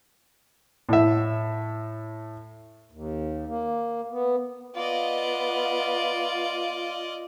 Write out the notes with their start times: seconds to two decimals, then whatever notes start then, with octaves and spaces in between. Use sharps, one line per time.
0.89 A2 E5
2.92 D#2
3.48 A#3
4.11 B3
4.75 B3 F4 D5 D#5